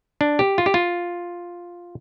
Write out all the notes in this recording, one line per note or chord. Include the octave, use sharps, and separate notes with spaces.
D4
G4
F4
G4
F4